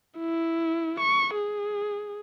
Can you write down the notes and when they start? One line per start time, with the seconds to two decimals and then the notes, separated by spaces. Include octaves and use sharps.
0.18 E4
1.00 C#6
1.35 G#4